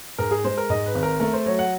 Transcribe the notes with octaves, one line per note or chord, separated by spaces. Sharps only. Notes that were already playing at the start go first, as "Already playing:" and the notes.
G#2 A#4
G#4
G#3 C5
A#4
G#2 D#5
B4
G#1
A#4
A3 A#4
C5
F#3 C#5
F#5